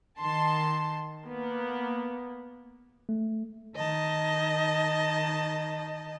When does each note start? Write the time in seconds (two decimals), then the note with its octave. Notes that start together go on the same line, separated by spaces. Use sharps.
0.19 D#3 A5 C6
1.25 A#3 B3
3.09 A3
3.76 D#3 D#5 A5